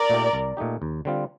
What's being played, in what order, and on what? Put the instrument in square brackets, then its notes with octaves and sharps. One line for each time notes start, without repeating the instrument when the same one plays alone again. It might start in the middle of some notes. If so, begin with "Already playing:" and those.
Already playing: [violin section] A#4 D5
[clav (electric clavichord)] A#2 A3 D#4 G4
C2
A#2 A3 D#4 G4
D#2
D3 G3 C4 F4